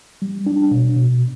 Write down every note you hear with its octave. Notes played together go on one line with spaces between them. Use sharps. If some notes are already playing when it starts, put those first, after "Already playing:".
G3
D4
B2
B2